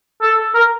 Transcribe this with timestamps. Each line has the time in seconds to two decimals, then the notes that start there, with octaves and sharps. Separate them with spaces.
0.22 A4
0.55 A#4